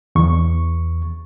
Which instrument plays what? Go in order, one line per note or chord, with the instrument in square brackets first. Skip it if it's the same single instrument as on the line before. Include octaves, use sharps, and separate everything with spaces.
[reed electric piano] E2 C#6